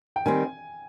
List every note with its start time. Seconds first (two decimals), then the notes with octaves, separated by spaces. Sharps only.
0.16 G5
0.26 D#3 G3 C4 G#5